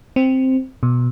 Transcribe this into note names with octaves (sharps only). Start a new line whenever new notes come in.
C4
B2